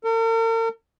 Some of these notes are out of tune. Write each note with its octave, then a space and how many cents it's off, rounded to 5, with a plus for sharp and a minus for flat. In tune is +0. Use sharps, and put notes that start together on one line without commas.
A#4 -45